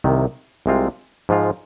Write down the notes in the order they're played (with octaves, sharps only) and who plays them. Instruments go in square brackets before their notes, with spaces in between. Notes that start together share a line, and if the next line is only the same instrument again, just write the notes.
[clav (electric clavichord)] C2 C3 D#3
C2 C3 G#3 C4 F4
G#2 F3 G#3 F4